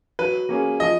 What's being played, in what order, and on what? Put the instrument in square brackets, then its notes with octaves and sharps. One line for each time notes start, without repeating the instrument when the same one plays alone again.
[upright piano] F#3 [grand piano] B4
[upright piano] A#3 C#4 G#4
[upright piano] F3 [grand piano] D#5